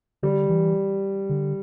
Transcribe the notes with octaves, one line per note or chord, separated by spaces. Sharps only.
D3 G3
E3
D3